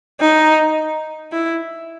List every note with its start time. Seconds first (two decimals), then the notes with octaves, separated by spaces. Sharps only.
0.20 D#4
1.32 E4